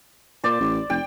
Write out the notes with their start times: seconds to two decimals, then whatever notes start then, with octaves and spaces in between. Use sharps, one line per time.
0.44 A#2 C5 D5
0.61 A1
0.90 F1 G5